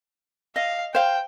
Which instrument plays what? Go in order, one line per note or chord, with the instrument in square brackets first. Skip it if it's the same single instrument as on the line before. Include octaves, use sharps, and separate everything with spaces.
[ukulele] D#5 [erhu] F5
[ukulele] C5 F5 [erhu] G5